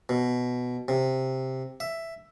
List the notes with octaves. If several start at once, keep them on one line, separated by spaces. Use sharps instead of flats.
B2
C3
E5